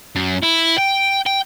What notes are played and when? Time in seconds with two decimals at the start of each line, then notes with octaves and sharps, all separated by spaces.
0.16 F#2
0.43 E4
0.78 G5
1.26 G5